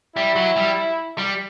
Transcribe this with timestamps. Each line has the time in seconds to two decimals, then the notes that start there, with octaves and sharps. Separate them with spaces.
0.15 G3 E4
0.36 F#3
0.56 G3
1.18 G3